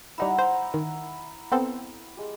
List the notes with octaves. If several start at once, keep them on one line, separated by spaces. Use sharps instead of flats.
G3 D#4 E4 F#5 A#5 E7
C5 A#5 D6
D#3
B3 C4 A4
G#3 G4